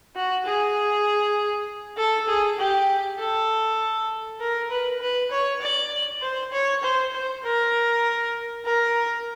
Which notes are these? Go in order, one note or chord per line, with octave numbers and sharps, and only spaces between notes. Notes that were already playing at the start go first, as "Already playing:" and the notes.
F#4
G#4
A4
G#4
G4
A4
A#4
B4
B4
C#5
D5
C5
C#5
C5
C5
A#4
A#4